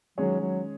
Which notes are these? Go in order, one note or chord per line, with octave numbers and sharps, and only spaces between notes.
D#3 F#3 G#3 C#4 G#4 C#5
F#3